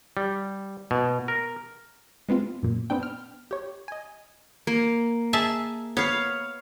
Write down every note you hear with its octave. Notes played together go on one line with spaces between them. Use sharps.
G3
B2
A#4
G#3 B3 C4 F4
F#2 A#2
B3 C4 D4 G5
F6
G4 C#5
D#5 G#5
A#3
G#4 E5 A5
B3 C#5 F5